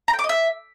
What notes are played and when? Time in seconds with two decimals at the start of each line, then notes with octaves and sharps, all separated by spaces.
0.08 A#5
0.13 G5
0.19 D6
0.24 D#5
0.29 E5